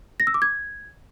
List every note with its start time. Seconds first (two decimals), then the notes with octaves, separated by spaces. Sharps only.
0.20 A#6
0.27 E6
0.34 D6
0.42 G#6